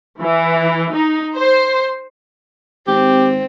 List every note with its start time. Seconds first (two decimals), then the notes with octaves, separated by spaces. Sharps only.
0.20 E3
0.91 D#4
1.36 C5
2.87 G#1 C4 G4